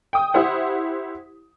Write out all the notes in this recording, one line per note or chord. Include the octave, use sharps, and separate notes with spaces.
G5 D#6
E4 G4 C5 F#5